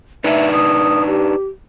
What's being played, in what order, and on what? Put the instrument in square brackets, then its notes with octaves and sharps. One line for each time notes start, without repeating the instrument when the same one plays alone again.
[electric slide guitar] D4 D#4 B4 [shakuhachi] E5
[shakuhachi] D#6
G4